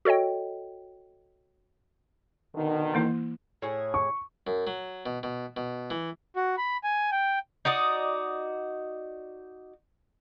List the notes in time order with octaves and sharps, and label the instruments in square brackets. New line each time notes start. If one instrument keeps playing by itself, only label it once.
[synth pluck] F#4 A4 C#5 D#5 G5
[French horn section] B2 D3 D#3
[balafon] E3 A#3 E4
[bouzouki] A2 G#4
[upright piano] C#6
[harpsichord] F#2
F#3
B2
B2
B2
E3
[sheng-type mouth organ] F#4
B5
G#5
G5
[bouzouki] D#4 F#4 D5 D#5